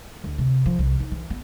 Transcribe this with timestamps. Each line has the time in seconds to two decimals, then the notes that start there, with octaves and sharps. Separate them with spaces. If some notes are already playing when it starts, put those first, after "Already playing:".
0.24 D2
0.38 C3
0.66 F3
0.79 C2
1.00 D#4
1.12 E3
1.30 B3